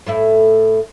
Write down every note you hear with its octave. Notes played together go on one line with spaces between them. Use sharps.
A2 A3 E4